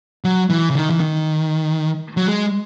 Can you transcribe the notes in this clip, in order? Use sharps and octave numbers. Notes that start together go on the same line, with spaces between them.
F#3
E3
C#3
D#3
E3
D#3
F#3
G#3